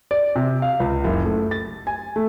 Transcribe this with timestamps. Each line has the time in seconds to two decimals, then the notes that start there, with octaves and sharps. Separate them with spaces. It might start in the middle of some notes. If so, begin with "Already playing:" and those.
0.11 D5
0.36 C3
0.62 F5
0.80 C#2
1.04 F#1
1.25 A3
1.51 A6
1.87 G#5
2.16 A3